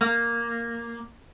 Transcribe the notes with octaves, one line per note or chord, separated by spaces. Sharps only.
A#3